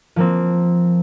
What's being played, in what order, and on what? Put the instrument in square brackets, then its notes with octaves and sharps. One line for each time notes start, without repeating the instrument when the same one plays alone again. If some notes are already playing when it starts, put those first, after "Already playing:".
[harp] F3 A#3 C4